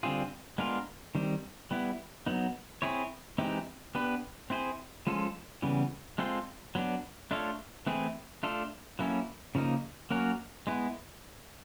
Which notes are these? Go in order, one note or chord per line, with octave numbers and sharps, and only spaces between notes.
D3 G3 C4 F4 G#4
G#3 B3 D4 F4 A#4
D#3 G3 C4
G3 B3 E4
F#3 B3 D#4
C4 E4 G#4 C#5
E3 G#3 C4 D#4 G4
B3 D4 G4 B4
C4 E4 G#4 C5
F3 G#3 C#4 F4 A4
C#3 E3 G3 B3
G#3 C4 F4 A4 C5
F#3 B3 D4
A3 D4 F4 A4 C#5
E3 A3 C4 E4 G#4
A3 D4 F4 A4
F#3 A#3 C#4 E4 A4
C#3 F3 A#3 D#4
F#3 A#3 C#4 F#4 A#4
G#3 B3 E4